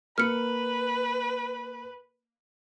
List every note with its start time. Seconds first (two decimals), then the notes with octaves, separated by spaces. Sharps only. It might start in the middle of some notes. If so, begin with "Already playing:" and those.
0.18 A#3 B4 F6 C#7